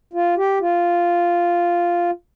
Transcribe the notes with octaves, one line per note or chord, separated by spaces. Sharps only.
F4
G4
F4